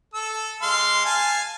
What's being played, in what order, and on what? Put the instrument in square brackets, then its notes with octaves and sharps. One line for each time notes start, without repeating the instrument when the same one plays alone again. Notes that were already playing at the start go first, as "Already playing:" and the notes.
[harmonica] A4 E6
G#3 F5 C6
F5 G#5 A5